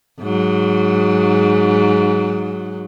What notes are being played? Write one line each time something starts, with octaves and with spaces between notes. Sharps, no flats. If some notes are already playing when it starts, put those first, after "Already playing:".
G#2 F#3